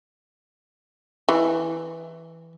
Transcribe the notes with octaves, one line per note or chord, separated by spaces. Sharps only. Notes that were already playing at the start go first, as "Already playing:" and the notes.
E3